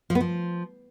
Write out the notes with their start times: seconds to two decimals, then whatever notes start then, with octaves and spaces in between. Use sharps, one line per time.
0.10 F3
0.15 B3
0.21 F3